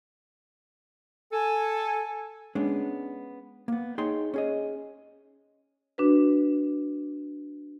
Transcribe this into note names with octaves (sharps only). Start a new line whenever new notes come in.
A4 G#5
G#3 B3 C#4 D4 G#4
A#3 B3
D#4 G#4 C#5 G5 C6
C#4 G#4 D#5
D4 F#4 B4